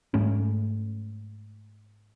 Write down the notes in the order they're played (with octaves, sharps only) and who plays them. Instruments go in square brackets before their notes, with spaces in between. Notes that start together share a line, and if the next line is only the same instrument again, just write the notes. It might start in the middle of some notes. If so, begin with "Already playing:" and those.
[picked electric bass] G#2 F#3 A3 C#4